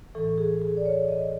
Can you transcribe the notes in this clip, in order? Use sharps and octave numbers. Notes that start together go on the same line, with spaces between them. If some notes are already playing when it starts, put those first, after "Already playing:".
A2 E3 A4
G#4
G#4
D5
C#5
D#5